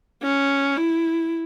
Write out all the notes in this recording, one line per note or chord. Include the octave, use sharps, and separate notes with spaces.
C#4
E4